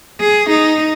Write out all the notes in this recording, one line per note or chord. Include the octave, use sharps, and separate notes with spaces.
G#4
D#4